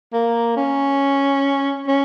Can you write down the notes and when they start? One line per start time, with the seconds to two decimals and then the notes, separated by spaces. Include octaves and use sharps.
0.13 A#3
0.57 C#4
1.88 C#4